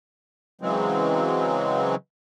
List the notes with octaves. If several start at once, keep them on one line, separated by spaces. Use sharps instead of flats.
C#3 E3 F#3 G#3 C4